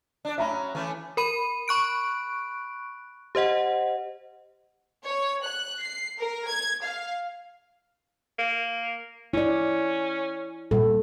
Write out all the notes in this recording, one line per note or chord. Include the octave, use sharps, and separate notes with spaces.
D4 D5
F#3 C#4 E5 A#5 B5
E3 A3 C#4
A#4 B5 D#7
B5 C#6 F#6 D7
G4 C5 D#5 F#5
C#5
F#6
C7
A#4
G#6
F5
A#3
C#4 E4 D5
A#2 G3 A4